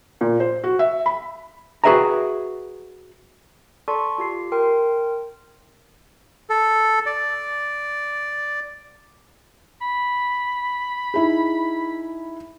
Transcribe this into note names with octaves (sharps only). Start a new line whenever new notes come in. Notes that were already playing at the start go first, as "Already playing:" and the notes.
A#2
C5
F#4
E5
B5
F#4 G#4 B4 E5 G5 A#5
A4 D5 A5 C6 C#6
F4 G4 C7
A#4 G5 C6
A4
D5
B5
D#4 E4 G#4